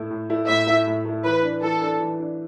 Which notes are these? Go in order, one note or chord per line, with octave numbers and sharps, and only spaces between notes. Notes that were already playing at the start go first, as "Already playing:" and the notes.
Already playing: A2 A3 E4
A2
A3 E4
A2 E5
A3 E4
A2
A3 E4
E3 B4
D4
E3 A4
D4
E3
D4